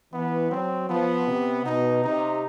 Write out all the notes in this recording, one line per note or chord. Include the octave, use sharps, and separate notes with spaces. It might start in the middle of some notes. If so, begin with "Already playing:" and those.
E3 B3
F#3 C4
F3 B3
C3
B2 D#4
C3 D#4